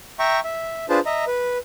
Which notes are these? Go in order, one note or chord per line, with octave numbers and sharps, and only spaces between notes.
E5 G5 A#5 C#6
E5
D4 F4 G#4 B4 C5 A5
D#5 E5 A#5
B4